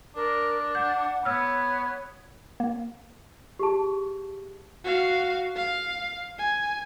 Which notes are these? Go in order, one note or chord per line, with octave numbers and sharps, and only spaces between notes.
D4 A#4
F#5 G6
B3 C#5 E6 F6
A#3
G4 G#4 A5
F#4 F5
F5
G#5